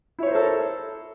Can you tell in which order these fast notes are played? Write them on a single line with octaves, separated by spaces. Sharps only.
E4 C#5 C5 A#4 A4